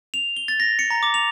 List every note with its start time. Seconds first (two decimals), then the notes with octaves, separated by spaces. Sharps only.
0.14 F7
0.37 G7
0.48 A6
0.60 A#6
0.79 C#7
0.90 A#5
1.03 D6
1.14 F7